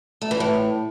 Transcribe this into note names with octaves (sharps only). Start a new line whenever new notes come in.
A3
E3
A2